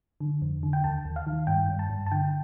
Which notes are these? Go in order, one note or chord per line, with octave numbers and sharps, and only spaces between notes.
D3
F2
D3
G5
D#2 A5
D#2
F5
D#3
G2 G5
G2
A5
G2
A5
D3 G5